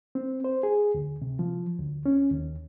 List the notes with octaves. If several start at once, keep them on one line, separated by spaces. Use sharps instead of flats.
C4
C5
G#4
D2
C3
F3
D2
C#4
D#2